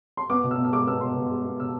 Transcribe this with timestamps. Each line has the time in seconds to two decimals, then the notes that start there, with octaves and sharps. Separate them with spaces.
0.17 C6
0.30 B3 D6
0.43 B2
0.51 E6
0.58 B2
0.64 E6
0.72 G#3 D6
0.87 B3 E6
1.01 B2 C6
1.16 B2
1.30 G#3
1.45 B3
1.59 B2 E6